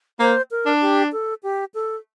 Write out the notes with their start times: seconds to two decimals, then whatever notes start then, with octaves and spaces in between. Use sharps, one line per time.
0.20 A#3 C5
0.51 A#4
0.66 D4
0.81 G4
1.12 A4
1.43 G4
1.74 A4